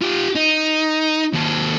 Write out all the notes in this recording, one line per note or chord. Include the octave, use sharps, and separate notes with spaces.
F4 G4
D#4
D#2 A4